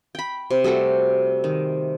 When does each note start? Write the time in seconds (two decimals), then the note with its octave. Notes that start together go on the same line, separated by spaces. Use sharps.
0.15 G5 B5
0.50 C3
0.64 G3 A3 F#4 A4
1.44 D#3